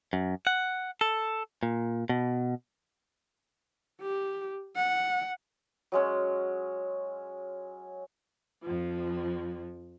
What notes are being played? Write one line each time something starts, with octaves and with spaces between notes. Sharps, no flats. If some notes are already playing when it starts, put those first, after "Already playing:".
F#2
F#5
A4
A#2
B2
G4
F#5
F#3 G#3 C#4
F2 F3